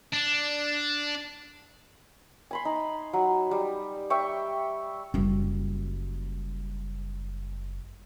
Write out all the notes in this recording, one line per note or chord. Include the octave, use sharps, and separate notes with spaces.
D4
G#5 B5 C6
D#4
F#3
G3
E5 G5 C#6
F#1 G3